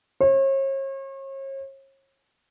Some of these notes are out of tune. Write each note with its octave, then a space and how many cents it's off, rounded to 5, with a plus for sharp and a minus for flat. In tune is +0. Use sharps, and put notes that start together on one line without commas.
C#5 -40